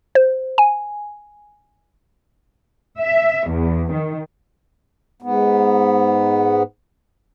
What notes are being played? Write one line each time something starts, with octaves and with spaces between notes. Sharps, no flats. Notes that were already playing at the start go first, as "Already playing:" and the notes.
C5
G#5
E5
E2
D#3
G#2 B3